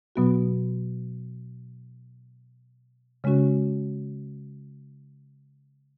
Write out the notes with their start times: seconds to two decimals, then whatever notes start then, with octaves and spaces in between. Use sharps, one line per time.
0.16 B2 F#3 B3 F#4
3.24 C#3 G#3 C#4 F#4